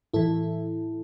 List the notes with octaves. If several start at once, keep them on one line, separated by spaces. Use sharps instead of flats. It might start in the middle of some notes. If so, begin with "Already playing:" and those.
A2 E3 E4 A4